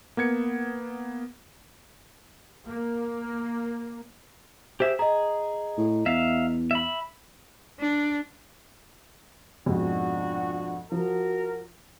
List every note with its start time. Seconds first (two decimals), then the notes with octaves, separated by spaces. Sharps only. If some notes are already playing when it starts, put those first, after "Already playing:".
0.17 A#3 B3 G#6 C#7
2.67 A#3
4.80 G4 G#4 C5 E5
4.99 G#4 D#5 A#5
5.78 A2
6.06 E2 E5 F5
6.71 E5 B5
7.80 D4
9.66 F2 G#2 B2 D4 F4 F#4
10.92 F3 F#4 A#4